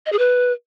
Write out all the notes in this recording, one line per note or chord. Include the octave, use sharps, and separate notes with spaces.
D#5
G#4
B4